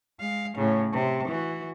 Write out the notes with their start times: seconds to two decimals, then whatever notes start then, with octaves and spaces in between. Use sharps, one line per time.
0.19 G#3 F5
0.57 A2 C#3
0.93 C3
1.28 E3 F#4